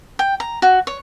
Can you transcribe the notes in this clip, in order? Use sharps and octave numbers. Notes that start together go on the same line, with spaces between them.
G5
A#5
F#4
C#5